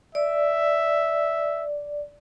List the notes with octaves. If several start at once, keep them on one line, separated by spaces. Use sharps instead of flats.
D5 E5